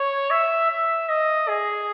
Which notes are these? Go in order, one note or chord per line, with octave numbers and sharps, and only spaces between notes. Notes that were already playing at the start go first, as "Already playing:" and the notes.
Already playing: C#5
E5
E5
D#5
G#4